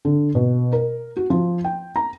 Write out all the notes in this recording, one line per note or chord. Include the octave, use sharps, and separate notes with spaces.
D3
B2
A#4
F#4
F3
G5
A#5